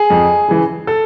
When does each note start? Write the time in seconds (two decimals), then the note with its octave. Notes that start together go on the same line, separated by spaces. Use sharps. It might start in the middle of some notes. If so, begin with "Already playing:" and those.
Already playing: G#4
0.10 F2
0.48 C#3 E3
0.87 A4